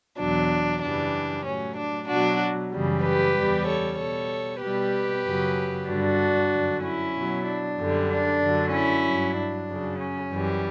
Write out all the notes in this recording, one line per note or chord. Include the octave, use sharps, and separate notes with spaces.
E2 B2 F#3 D4
F#2 C#3 E3 G3 D4
A2 F#3 C#4
D4
B2 F#3 D4 F#4
F#2 C#3 E3 G3
G4 B4
E2 C#3 G3
A4 C#5
B2 G3 A4 C#5
B2 G3 G4 B4
F#2 C#3 F#3
G2 D3 G3 D4 F#4
F#2 D3 F#3
C#4 E4
B2 F#3
D4
F#2 D3 G3
D4
F#2 D3 F#3
C#4 E4
G2 F#3
D4
F#2 C#3 F#3
C#4
F#2 E3 G3